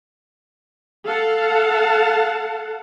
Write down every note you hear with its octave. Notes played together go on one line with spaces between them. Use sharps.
A4 F5 F#5 A5